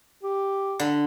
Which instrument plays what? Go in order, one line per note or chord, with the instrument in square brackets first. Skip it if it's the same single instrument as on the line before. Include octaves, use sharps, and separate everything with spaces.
[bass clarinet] G4
[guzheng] D3 B5